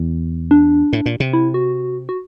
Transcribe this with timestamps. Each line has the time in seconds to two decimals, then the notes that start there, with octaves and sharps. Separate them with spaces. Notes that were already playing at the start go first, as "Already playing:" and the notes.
Already playing: E2
0.51 D4
0.93 A2
1.06 A#2
1.20 C3
1.33 E4
1.54 F#4
2.09 F#4